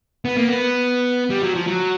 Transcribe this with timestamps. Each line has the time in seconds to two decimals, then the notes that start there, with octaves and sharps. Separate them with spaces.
0.25 B3
0.37 A#3
0.49 B3
1.30 G3
1.43 F#3
1.55 F3
1.68 F#3